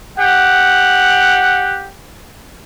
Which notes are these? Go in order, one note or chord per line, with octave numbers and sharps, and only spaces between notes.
G4 F#5